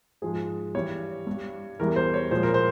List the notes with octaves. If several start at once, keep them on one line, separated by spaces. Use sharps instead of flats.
G#2 F3 G#3 G#4
G2 E3 G3 C#5
G2 G3
E2 E3 G3 A#4
C5
C#5
A#2 F3 G#3 C5
A#4
C5